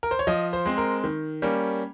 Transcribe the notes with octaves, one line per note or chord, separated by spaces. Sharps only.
A#4
C5
C#5
F3 D#5
C5
G#3 C4
A#4
D#3
G3 A#3 C#4